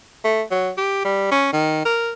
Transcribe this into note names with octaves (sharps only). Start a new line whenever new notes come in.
A3
F#3
G4
G3
C#4
D#3
A#4